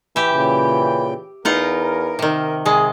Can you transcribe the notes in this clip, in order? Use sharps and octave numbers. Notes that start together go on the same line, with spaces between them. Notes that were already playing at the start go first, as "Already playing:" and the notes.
E3 G4 E5
A#2 C#3 G5
E2 D#4 F4 A#4 F#5
C3 D#3
C3 G#3 G#4